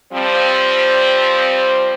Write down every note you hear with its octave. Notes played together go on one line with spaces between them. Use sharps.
F3 G3 C4